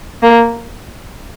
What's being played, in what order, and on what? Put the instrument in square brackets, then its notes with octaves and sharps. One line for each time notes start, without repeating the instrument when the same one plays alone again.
[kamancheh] A#3